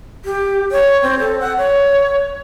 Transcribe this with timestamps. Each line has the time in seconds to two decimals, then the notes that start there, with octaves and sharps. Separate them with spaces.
0.25 G4
0.72 C#5
1.03 C4
1.19 A4
1.40 F#5
1.58 C#5